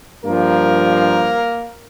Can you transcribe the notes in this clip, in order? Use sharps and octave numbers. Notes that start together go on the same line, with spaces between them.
G2 F3 A#3 A#4